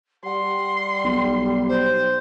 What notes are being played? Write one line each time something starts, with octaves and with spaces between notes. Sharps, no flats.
G3 F#5 C6
B1
C5